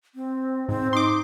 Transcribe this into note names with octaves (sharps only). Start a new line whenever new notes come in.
C4
G#2 C4
D#4 C6 D6